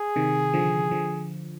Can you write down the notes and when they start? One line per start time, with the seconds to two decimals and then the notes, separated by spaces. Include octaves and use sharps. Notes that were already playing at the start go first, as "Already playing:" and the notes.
Already playing: G#4
0.16 C3 D#3
0.54 D3 F3
0.91 D3 F3